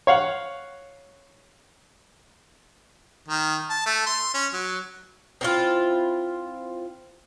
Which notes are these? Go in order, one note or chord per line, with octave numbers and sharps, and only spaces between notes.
C#5 F5 F#5
D#3
A5
A3
C6
C#4
F#3
C4 E4 F4